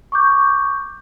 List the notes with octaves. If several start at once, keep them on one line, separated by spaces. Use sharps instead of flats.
C#6 D6 G6